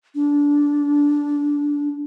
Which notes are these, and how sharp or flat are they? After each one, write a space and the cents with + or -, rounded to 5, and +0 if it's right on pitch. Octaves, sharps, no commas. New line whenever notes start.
D4 -15